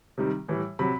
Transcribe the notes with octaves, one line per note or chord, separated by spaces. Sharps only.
C3 D#3 G3
A2 E3 G3
C3 F#3 B5